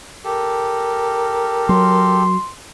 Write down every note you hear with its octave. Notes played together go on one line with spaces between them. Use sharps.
G4 A4 A#4
F#3 C6